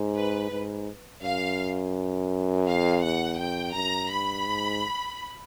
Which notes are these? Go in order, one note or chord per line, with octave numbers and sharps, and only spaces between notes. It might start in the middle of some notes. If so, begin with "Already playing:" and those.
Already playing: G#2
B4
G#2
F#2 F5
F2 F5
E2 F#5
F2 G5
F#2 A#5
G2 B5
G#2